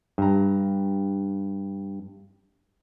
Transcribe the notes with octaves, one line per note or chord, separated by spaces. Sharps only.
G2 A#5